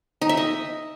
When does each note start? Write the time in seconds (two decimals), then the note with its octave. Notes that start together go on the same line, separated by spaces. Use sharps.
0.21 D#4
0.29 E5
0.37 D#5